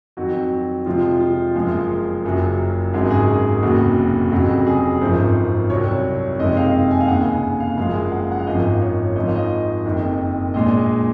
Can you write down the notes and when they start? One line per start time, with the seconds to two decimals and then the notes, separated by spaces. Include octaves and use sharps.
0.17 F2 D#3 F#3 F#4
0.86 F2 C3 F3 G#3 F4
1.20 F4
1.55 F#1 F#2 F3 G#3
2.24 F#1 F#2 C#3 F#3
2.93 G#1 F#2 C#3 G#3 F#4
3.11 G#4
3.28 G#4
3.62 F1 D#2 C#3 F#3 F#4
4.31 F1 F2 C#3 F#3 F#4
4.67 G#4
5.01 G#1 F#2 F3 C5
5.70 C2 C3 F#3 C#5
6.39 F#1 F2 C3 D#3 G#3 D#5
6.57 F5
6.91 G#5
7.01 F5
7.08 F1 D#2 C#3 F#5
7.25 G#5
7.43 G#5
7.60 F5
7.77 F#1 F#2 C#3 F3 G#3 F5
8.12 F#5
8.32 F#5
8.39 F5
8.47 G#1 F#2 F3 D#5
8.82 C#5
9.15 G#1 G#2 F3 D#5
9.26 F5
9.36 D#5
9.85 F#1 F2 D#3
10.54 A#1 A#2 G#3 D#5